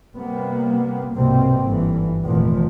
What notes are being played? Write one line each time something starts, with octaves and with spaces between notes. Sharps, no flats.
C3 G3 A#3 B3
C2 G#2 B2 A#3 C4
G1 E3
F1 E2 A#2 D#3 F3